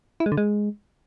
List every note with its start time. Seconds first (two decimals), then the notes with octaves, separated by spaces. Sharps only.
0.20 E4
0.26 G#3
0.32 D3
0.37 G#3